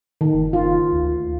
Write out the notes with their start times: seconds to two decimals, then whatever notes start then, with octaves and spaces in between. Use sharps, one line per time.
0.21 D#3
0.33 F#1
0.53 F4
0.92 D2